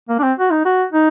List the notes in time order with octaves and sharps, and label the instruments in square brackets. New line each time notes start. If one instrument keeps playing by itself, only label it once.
[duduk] A#3
D4
C4
F#4
D#4
F#4
D#4